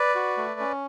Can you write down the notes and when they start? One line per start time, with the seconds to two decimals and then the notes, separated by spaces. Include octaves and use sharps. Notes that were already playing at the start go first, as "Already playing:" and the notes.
Already playing: B4 D5
0.15 F#4
0.37 A3
0.60 C#4